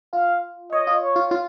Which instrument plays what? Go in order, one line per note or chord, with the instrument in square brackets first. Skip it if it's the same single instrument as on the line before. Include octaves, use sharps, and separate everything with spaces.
[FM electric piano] F4 [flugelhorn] F5
[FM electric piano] C#5 [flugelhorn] D#5
[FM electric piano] F4
[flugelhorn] C#5
[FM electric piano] F4
F4